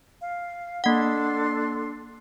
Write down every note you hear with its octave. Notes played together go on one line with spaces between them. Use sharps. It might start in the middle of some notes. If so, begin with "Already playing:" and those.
F5
A#3 D4 A4 F#5 C6